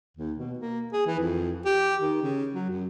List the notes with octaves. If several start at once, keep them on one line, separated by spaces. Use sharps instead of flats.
D#2
B2
A#3
G#4
E3
F2
G4
D#3
C#3
F#3
F#2